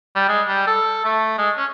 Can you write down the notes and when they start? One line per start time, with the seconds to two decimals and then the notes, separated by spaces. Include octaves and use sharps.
0.16 G3
0.29 G#3
0.48 G3
0.67 A4
1.05 A3
1.38 G#3
1.57 C#4